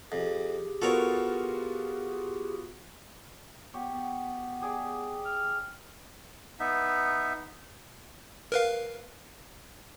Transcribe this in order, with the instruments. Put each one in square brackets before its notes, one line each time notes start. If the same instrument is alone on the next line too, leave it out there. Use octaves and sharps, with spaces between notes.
[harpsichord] F2 [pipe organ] G4 G#4
[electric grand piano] B3 F4 F#4 [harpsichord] A4 A#4 C#5
[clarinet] B3 [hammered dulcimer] G4 C#5
[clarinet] B3
[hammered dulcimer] G4 G#4 D5
[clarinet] F6
[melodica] B3 D#4 E5
[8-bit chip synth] A#4 B4 F5